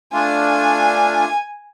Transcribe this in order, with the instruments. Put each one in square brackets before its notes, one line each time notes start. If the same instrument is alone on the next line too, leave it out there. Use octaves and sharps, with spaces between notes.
[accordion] A3 D4 F4 [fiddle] G#5